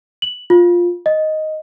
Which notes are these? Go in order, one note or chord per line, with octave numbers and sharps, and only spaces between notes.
F#7
F4
D#5